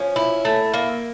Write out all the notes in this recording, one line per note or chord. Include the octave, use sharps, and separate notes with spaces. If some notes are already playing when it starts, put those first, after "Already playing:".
Already playing: F3 C#4
E4
A3
A#3